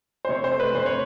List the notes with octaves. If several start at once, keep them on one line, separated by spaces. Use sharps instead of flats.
C5
C3 C#5
C5
A3
B4
C3 C5
C#5